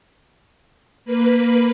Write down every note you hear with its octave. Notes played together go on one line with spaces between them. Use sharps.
A#3 B4